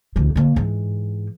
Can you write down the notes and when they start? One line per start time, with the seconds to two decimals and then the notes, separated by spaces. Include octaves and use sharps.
0.16 D2 E3
0.36 D3 A#3
0.56 G#2 E3